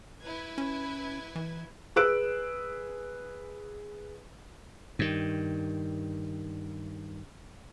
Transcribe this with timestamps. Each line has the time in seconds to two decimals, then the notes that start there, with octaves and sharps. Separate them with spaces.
0.22 E4 B4 G#6
0.58 C#4
1.36 E3
1.96 G#4 B4 E6 F#6 D7
4.99 G2 D#3